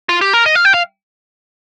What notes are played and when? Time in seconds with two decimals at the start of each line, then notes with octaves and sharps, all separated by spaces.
0.09 F4
0.21 G4
0.34 A#4
0.46 D#5
0.55 F5
0.65 G5
0.74 F5